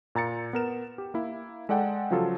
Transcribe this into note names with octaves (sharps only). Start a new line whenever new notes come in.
A#2 A#5 A6 C#7
B3 A#4 E7
G4
A#3 E4
G#3 A4 D5 F#5 G5
C#3 F3 F#3 F4 A4